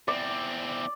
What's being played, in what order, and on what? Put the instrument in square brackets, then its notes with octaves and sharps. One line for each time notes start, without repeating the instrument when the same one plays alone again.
[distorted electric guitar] E2 C4 [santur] D5